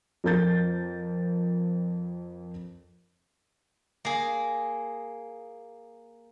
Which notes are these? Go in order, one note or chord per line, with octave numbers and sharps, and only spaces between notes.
F2 A#4 G6 A6
A#3 G#4